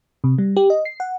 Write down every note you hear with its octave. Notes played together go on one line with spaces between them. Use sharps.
C3
G3
G4
D#5
C7
F#5